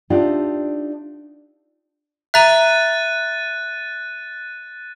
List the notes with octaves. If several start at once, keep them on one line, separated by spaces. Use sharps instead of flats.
D4 D#4 F4 G4 D5 E5
E5 A#5 F#6 A6 D#7